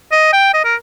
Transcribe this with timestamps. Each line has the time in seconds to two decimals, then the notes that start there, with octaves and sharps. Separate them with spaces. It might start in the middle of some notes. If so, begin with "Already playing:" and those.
0.12 D#5
0.33 G5
0.54 D#5
0.65 A#4